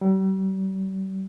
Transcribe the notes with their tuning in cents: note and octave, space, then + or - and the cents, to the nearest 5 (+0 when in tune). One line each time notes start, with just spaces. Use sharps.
G3 -45